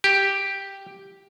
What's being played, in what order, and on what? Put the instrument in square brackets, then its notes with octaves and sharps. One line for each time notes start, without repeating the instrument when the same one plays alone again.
[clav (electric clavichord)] G4